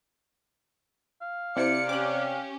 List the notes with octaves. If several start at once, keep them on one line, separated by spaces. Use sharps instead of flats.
F5
C3 C4 E4 D5 C#7
C#4 G4 D6 F#6